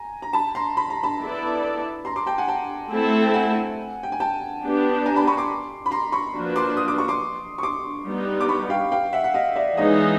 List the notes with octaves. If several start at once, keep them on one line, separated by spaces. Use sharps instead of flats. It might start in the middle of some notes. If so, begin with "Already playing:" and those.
Already playing: G#5 A#5
A#5
A5 B5
A#5 C6
B5
A#5
A5 B5
B3 E4 A4 D5
A#5 C6
C6 D6
G5 A5
F#5 G#5
G5 A5
A3 C4 E4 A4
G5
F#5 G#5
G5
G#5
G5 A5
B3 D4 G4
G#5 A#5
A5 B5
B5 C#6
C6 D6
B5
A#5 C6
B5 C#6
F3 A#3 D4 F#4 B4
C6 D6
D#6
D6
C#6
C6 D6
C#6
C6 D6
G3 B3 D#4
D6
B5 C#6
F5 G5
F5 G5
E5 F#5
F#5
D#5 F5
D5 E5
E3 G#3 B3 D#4 G#4 C#5 D#5